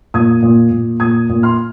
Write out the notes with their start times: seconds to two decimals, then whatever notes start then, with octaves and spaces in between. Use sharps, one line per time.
0.14 A#2 D#6 G#6
0.42 A#2
0.71 A#2
1.00 A#2 D#6 G#6
1.29 A#2
1.43 C6 F6